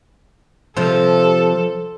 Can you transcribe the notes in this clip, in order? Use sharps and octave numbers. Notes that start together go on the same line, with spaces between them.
C3 F3 A4 C5